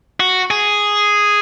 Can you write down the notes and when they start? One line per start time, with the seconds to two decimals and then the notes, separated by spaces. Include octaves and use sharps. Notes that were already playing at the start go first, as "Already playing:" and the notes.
0.20 F#4
0.51 G#4